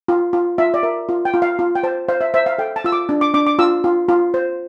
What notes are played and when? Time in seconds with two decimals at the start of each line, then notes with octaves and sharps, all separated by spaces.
0.08 F4
0.33 F4
0.58 F4 E5
0.74 D5
0.83 A#4 E5
1.09 F4
1.25 G5
1.34 F4
1.42 F5
1.59 F4
1.75 G5
1.83 C5 A5
2.09 C5 F5
2.21 E5
2.34 C5 E5
2.46 F5
2.58 A4 G5
2.76 A5
2.84 F4 E6
2.92 D6
3.09 D4
3.21 D6
3.34 D4 D6
3.47 D6
3.59 F4 E6
3.84 F4
4.09 F4
4.34 C5